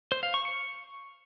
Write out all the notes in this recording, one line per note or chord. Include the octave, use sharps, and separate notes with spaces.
C5
F5
C#6
C#6